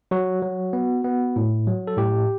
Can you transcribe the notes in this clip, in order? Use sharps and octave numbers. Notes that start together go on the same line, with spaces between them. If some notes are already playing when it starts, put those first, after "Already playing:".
F#3 F#4
F#3
B3
B3
A2
F#3
A4
A2 G4